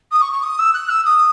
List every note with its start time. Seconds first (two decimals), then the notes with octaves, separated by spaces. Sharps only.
0.12 D#6
0.22 C#6
0.32 C#6
0.43 D#6
0.59 E6
0.74 F#6
0.89 E6
1.05 D#6